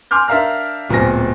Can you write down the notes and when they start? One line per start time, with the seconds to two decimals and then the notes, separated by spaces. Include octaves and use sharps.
0.11 G#5 C6 D6 F6 G6
0.28 D4 A#4 E5 F5 A#5 F6
0.90 D1 A#2 B3 C4 G#5 A#6